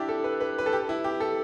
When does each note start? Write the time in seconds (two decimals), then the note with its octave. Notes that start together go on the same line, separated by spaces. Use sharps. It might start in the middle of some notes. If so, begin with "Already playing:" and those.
Already playing: D4 E4 G4
0.09 A4
0.24 B4
0.41 B4
0.58 B4
0.66 A4
0.73 G4
0.89 E4
1.04 G4
1.20 A4